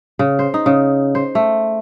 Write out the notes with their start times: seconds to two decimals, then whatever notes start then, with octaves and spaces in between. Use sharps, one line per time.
0.19 C#3
0.39 C5
0.54 D#4
0.66 C#3
1.15 C5
1.35 A3